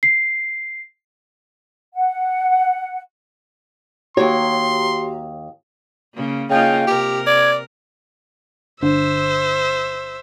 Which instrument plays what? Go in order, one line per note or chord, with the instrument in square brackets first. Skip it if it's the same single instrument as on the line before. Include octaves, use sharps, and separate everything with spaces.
[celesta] C7
[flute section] F#5
[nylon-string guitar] D#2 C#5 [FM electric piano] F#4 G4 A#5 [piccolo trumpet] C6
[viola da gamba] C#3 A#3
[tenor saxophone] C#3 [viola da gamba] A#3 D#4 F4 [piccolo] G5
[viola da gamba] C3 A#4 [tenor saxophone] G4
[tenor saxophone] D5 [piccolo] G#6
[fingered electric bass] G1 D3 D4 [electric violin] C5 E5